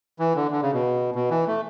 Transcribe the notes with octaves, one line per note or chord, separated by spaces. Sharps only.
E3
D3
D3
C#3
B2
B2
E3
A3